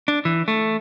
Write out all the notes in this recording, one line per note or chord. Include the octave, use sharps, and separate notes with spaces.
D4
E3
A3